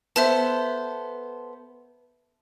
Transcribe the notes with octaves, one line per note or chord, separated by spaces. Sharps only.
B3 A4 C5 E5 A5